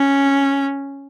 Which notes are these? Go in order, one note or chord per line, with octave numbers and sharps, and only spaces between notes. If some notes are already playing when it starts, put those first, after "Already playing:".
Already playing: C#4